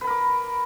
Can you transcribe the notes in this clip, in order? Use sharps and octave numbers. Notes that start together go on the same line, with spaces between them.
A#4 B4 B5 D6